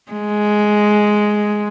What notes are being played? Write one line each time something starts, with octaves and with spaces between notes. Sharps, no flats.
G#3